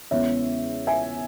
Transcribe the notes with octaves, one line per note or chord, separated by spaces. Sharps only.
E2 C#3 G#3 B3 E4 C#5 E5
E5 G#5